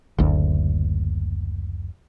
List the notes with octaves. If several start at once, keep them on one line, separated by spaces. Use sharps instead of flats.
F#1 D2